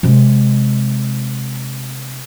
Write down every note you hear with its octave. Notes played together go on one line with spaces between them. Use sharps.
C3 G#3